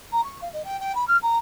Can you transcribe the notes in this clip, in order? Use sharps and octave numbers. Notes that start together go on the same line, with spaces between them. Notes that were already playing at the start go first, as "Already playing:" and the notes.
A#5
C#6
F5
D#5
G5
G5
B5
F6
A#5